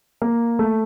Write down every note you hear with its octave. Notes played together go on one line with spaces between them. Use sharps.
A#3
A3